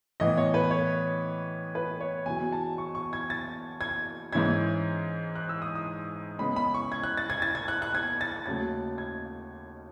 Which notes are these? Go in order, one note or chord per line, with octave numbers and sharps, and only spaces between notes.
A2 E3 B3 D#5
C#5
B4
C#5
B4
C#5
E2 B2 F#3 G#5
A5
C#6
C#6
G#6
A6
G#6
G#2 E3 G#3 C#4 E4 G#6
F#6
E6
D#6
D#6
C#3 G#3 B3 B5
B5
C#6
G#6
F#6
A6
G#6
A6
G#6
F#6
F#6
G#6
A6
D#2 C#3 F#3 A3 A6
G#6